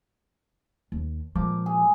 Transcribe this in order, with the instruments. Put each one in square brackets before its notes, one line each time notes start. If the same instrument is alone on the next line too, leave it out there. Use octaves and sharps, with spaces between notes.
[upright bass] D#2
[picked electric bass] A#2 F3 [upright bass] G#3 [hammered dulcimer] D6
[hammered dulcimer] G#4